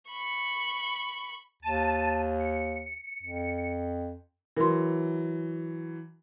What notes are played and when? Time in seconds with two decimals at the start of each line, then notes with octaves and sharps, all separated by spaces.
0.11 B5 C#6
1.62 D#2 A5 D#7
2.40 C#7
3.23 F2
4.56 E3 F#3 A#4 C6